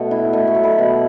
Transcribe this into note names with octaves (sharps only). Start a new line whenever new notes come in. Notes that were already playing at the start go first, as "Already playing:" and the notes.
Already playing: B2 A3 D#5 F#5
E4
A3 D#5
C#6
F#3
B5
B2